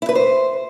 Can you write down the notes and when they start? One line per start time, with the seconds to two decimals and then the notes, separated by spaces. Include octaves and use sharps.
0.02 E4
0.09 B4
0.15 C5